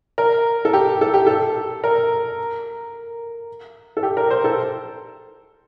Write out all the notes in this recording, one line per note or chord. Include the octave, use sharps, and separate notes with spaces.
A#4
A4
G4
A4
G4
A4
A#4
A4
G4
A#4
C5
A4